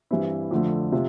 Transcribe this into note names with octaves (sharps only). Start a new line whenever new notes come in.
G2 E3 G3 C4 E4
F2 D3 A3
C3 F3